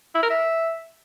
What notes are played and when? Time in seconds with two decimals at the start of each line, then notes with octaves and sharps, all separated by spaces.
0.15 E4
0.23 A#4
0.30 E5